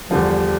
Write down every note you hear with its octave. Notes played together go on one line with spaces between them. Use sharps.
E2 D3 F3 G3